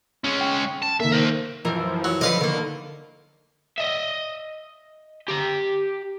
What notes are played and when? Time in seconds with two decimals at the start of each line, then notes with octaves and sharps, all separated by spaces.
0.24 G#3 C#4
0.41 G5
0.82 A5
1.00 D#3 A#3 E5
1.12 A#4 C5
1.65 F#2 E3 F3 A#4
2.04 F#3
2.21 D3 F3 B4 D#5 F5
2.41 D3 D#3 A#3
3.78 D#5 E5
5.28 G4 A#5